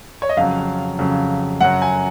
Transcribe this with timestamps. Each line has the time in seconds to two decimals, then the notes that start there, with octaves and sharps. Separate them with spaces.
0.22 C#5
0.29 D#5
0.37 F2 C#3 F#3 F5
0.99 F2 C#3 F#3
1.61 F#2 C#3 F#3 F#5
1.82 G#5